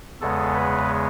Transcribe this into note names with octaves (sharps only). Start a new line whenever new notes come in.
E2 C#3 G#3 B3 A4
B4